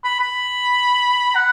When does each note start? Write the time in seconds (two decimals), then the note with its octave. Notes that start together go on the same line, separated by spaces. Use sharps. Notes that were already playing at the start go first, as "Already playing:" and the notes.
0.04 B5
0.20 B5
1.35 F#5